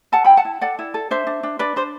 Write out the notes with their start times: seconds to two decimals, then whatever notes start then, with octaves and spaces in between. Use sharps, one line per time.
0.12 A4 F#5 A5
0.25 E4 G5 B5
0.37 F#5 A5
0.45 E4
0.61 A4 D5 F#5
0.79 E4
0.94 A4
1.11 D4 C5 E5
1.27 D4
1.43 D4
1.59 D4 B4 D5
1.76 D4 C5